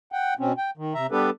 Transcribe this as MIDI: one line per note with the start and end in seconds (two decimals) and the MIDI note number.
0.12 0.34 78
0.12 0.34 79
0.39 0.53 47
0.39 0.53 60
0.39 0.53 61
0.58 0.70 79
0.77 0.94 51
0.94 1.06 48
0.94 1.06 76
0.94 1.06 82
1.11 1.30 55
1.11 1.30 59
1.11 1.30 62
1.11 1.30 67
1.11 1.30 69
1.11 1.30 71